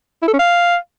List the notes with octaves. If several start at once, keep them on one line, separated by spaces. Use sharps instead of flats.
E4
A4
C#4
F5